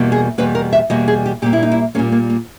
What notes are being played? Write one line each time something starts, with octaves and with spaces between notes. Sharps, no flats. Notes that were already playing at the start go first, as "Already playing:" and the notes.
Already playing: E2 B2 G3 A#3
G#4
E2 B2 G3 A#3 B4
A#4
E5
E2 B2 G3 A#3 D#5
G#4
G4
A#2 G3 A#3 G4
E4
D#4
E4
A#2 G3 A#3 C#4
A#3
A#3